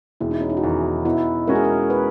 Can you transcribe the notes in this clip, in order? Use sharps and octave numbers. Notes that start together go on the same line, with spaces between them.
E1 E4
D#4
C#4
D#4
F#4
E2 D#3 E4
B2 E4
G#3 C#4 F#4 A#4
G#4
A#4
B4